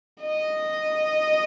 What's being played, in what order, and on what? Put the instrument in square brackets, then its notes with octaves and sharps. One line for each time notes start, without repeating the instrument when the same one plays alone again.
[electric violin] D#5